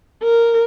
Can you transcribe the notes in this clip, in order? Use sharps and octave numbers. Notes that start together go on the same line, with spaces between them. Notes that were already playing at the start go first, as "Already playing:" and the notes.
A#4